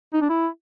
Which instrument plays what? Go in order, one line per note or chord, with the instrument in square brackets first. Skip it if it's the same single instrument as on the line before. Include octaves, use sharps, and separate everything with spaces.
[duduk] D#4
D4
E4